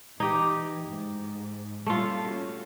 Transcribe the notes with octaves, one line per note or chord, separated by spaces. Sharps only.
E3 D#4 G4
G#2
G3 A3 A#3 C#4 F4
C#4 F#4